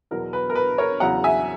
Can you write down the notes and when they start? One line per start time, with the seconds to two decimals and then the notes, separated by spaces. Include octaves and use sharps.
0.11 E2 B2 F#3 A#4
0.33 B4
0.50 A#4
0.55 B4
0.78 A#4 C#5
1.00 E2 C#3 F#3 F#5 A#5
1.24 E5 G#5